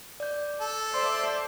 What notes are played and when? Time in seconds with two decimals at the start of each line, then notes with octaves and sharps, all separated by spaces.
0.20 D5 G6
0.61 A4
0.94 C5 D5 E5 C6